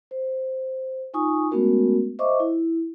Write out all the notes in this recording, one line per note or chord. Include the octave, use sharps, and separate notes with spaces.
C5
D#4 F4 G#5 C#6 D#6
G#3 A3 B3 C#4 F#4 A#4
C5 D#5 E5 C#6 D6
E4